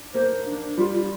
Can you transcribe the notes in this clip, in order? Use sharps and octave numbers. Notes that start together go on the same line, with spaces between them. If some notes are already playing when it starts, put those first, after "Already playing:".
Already playing: D4
A#3 C5
D4
G3 F4
F4